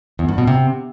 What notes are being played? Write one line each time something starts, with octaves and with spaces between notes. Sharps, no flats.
E2
G2
B2
C3